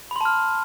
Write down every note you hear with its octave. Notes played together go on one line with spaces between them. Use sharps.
A5 B5 C6 F6